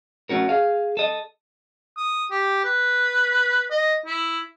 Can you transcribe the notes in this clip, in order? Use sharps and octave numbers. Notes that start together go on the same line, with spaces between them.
A3 C#4 F#4 A#4
G#4 F5
A4 D#5
D#6
G4
B4
D#5
E4